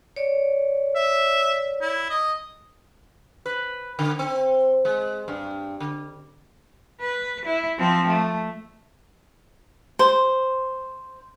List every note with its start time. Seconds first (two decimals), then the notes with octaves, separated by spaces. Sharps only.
0.16 C#5 D5
0.95 E5
1.81 E4
2.10 D#5
3.46 B4
3.99 D3
4.19 C4
4.85 G#3
5.28 G2
5.80 D3
7.01 B4
7.46 E4
7.79 F3 C4
8.08 A3
9.99 C5